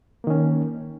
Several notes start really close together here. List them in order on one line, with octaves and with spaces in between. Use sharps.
A#3 D#3 C#4